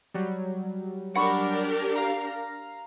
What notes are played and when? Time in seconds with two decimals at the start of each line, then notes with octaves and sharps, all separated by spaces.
0.14 F#3 G3
1.15 D4 G4 A#4 F#5 B5 C#6
1.95 F5 A#5